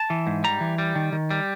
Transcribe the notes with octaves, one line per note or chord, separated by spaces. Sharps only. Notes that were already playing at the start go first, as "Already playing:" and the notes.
Already playing: A5
E3
G#2
G3 A#5
E3
G3
D#3
D#3
G3